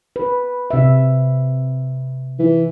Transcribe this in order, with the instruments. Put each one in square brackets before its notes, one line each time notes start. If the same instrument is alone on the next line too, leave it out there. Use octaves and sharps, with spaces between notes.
[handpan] B4
C3 E5
[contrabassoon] E3